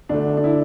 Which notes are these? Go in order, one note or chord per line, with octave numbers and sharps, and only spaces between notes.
D2 D3 A3 D4
D4
E4